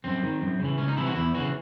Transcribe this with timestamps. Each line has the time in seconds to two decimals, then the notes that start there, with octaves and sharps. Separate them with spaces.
0.04 F#2 C4
0.23 D#3
0.41 F#2
0.60 C#3 E3
0.78 C#2 C#4
0.88 D#4
0.97 C3 E3 E4
1.06 F#4
1.15 E2 E4
1.34 C#3 E3 F#4